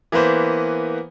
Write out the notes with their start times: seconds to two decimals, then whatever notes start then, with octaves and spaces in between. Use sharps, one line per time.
0.12 E3 A#3 B3 B4 C5